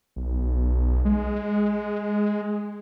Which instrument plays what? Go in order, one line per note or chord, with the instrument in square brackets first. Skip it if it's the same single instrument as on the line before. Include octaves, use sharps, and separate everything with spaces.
[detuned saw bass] B1
G#3